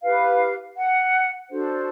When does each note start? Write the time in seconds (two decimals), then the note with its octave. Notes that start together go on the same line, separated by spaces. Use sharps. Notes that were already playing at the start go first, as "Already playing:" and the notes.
0.02 E4 G4 B4 F5
0.76 F#5
1.51 D4 F#4 A4 C5